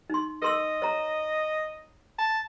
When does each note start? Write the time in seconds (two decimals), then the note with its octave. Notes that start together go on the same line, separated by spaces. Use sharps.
0.10 D#4 C6
0.42 A#4 D#5 C6 E6
0.82 C#5 A#5
2.19 A5